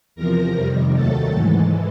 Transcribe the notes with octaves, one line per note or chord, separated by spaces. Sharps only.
E2 C3 F3 A#4 A#5
F2 C3 D#3 G3
D#2 D#3 F#3 A3 A4 A5
G#2 E3 G#3